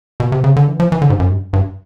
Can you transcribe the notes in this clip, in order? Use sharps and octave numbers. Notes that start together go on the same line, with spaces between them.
B2
C3
C#3
D3
E3
F3
E3
D3
G#2
F#2
G2
G2